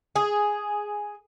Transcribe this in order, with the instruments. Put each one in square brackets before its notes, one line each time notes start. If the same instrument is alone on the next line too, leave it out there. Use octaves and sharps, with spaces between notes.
[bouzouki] G#4